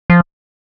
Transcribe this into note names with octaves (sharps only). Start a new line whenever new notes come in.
F3